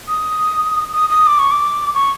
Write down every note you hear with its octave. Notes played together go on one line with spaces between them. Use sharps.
D#6
D#6
D#6
D6
C#6
D6
C#6